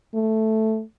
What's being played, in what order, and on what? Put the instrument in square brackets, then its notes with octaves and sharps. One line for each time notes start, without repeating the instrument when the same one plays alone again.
[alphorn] A3